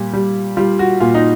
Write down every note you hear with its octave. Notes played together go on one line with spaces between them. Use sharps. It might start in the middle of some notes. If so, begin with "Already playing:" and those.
Already playing: A#2 G3
G3
G3 F4
F#4
A#2 F4
D#4